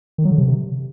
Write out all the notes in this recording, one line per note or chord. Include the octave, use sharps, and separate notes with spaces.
D#3
F#3
D3
C3